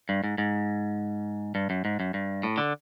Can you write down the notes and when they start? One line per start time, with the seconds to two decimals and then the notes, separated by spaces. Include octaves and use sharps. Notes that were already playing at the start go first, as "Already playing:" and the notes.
0.09 G2
0.24 G#2
0.38 G#2
1.55 G2
1.70 F#2
1.85 G#2
2.00 F#2
2.14 G2
2.43 A2
2.58 D3